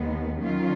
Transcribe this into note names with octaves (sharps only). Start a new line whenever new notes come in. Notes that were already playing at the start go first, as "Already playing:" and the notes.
Already playing: D#2 D#3 G#3 B3
D#3 F#3 C#4 F4